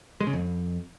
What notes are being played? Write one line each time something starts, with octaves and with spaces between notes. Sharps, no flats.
G#3
C#3
F2